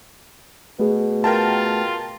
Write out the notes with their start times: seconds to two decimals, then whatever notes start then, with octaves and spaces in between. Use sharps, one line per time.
0.80 B2 A3 G#4
1.24 F4 A#4 G5 A5